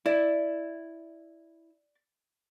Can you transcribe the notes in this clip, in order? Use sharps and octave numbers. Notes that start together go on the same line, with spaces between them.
E4 D5